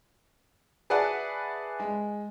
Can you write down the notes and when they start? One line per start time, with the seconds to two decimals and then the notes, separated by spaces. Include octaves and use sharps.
0.90 G#4 B4 D5 E5 F#5 A5
1.80 G#3